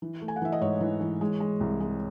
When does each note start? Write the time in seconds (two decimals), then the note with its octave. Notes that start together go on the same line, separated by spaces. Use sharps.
0.02 E3
0.22 A3
0.28 G#5
0.36 F#5
0.41 E3 E5
0.52 D#5
0.61 G#2 C#5
0.81 E3
1.01 E3
1.21 G#3
1.40 G#3
1.60 C2
1.80 G#3